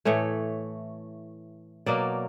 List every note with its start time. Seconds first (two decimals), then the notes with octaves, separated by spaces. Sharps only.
0.05 A2 E3 A3 C#5
1.86 B2 F#3 A#3 D5